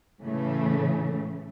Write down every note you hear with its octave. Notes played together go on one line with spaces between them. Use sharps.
A2 C#3 E3 A3